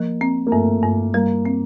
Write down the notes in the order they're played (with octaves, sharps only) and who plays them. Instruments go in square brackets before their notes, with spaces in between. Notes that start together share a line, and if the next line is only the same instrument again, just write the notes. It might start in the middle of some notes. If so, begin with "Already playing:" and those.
Already playing: [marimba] F3 [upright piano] A#3
[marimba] C4
[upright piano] A#3
[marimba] G2 [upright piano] A3
[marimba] G2
[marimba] G3 [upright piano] A#3
[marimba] C4